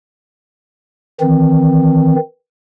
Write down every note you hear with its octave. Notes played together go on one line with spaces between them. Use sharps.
D#3 E3 C4